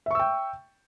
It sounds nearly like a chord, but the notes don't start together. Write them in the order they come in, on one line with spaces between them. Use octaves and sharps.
E5 C#6 E6 G5